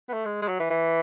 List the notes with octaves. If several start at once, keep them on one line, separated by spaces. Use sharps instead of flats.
B3
A3
G#3
G#3
F#3
E3
E3